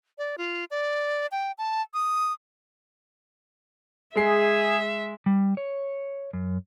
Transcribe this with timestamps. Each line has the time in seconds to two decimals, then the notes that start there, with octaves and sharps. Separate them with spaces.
0.18 D5
0.38 F4
0.71 D5
1.32 G5
1.58 A5
1.94 D#6
4.16 G#3 G#4 E5 C7
5.26 G3
5.57 C#5
6.33 F#2